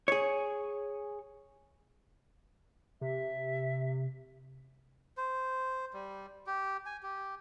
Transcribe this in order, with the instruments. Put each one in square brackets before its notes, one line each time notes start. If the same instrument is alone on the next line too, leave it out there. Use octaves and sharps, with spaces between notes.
[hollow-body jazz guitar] G#4 C#5
[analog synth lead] C3 [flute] E5
[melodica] C5
G3
G4
G#5
G4